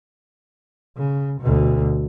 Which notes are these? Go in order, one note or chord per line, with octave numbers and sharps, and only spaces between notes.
C#3
D2 B2